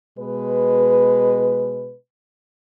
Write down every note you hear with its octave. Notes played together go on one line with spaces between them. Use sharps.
B2 G#3 B4